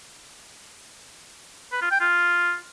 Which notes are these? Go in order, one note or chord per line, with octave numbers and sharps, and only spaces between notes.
B4
F4
G5
F4